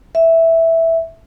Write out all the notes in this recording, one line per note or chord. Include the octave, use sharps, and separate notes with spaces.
E5